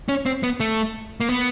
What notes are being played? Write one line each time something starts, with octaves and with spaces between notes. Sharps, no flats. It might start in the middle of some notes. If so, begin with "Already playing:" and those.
C#4
C4
B3
A3
A#3
B3